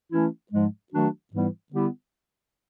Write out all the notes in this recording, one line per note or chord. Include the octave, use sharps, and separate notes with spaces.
E3 A3 C#4 E4
G#2 F3 G#3
D#3 F#3 A3 D4 F#4
G#2 E3 G3 B3 E4
D3 G3 B3 E4 G4